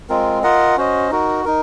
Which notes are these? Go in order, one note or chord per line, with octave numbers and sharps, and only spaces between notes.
G#3 C4 F4 A#4
F4 A#4 D#5 F#5
C#4 F#4 C5 D#5
D#4 F#4 A#4
D#4 A#4